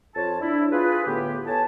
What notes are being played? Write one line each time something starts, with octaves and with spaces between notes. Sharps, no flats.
F2 F4 C#5 A5
D4 E4
F4 G#4 B4
A2 D3 B3 G4
A4 B4 C#5 G#5 A5